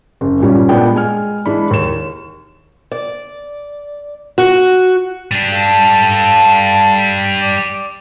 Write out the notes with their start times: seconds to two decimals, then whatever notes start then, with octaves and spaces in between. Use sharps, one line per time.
0.21 F#1
0.40 G2 A#2 G3 C#4
0.69 A#2 G#3 B3 D4 G5
0.95 G#3 G#5 F6
1.46 E3 G#3 D4 B5
1.71 D#2 E7
2.92 D5
4.38 F#4
5.31 G3 D4
5.52 A4 F5 A5
7.41 D5